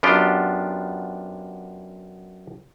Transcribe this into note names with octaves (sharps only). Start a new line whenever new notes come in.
F#2 B3 D4 F4 G4 G5